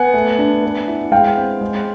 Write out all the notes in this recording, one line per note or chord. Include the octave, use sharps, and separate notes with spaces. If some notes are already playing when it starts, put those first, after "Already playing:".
Already playing: B3 F#5 G#5
A3
D4
B3
E4
G#3 F5 G5
C4
G#3